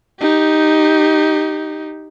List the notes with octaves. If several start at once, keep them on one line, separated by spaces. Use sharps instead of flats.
D#4 G4